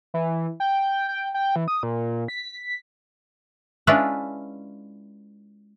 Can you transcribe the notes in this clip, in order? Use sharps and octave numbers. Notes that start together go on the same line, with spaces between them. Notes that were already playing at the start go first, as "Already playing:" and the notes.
E3
G5
G5
G5
E3
D#6
A#2
B6
G#3 C#4 D4 E4 F4 B4